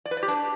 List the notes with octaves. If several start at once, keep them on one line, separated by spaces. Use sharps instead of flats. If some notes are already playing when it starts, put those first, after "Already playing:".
D5
B4
D5
G4
D4